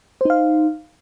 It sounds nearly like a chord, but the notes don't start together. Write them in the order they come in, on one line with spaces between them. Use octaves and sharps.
C5 D#4 F5